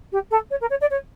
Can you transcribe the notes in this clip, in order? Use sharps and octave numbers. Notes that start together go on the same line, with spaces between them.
G4
A4
C#5
A#4
C#5
D5
C#5